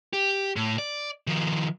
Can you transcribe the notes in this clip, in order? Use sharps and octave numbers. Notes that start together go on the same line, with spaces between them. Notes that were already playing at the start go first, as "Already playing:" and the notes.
G4
A2
D5
D#3 F3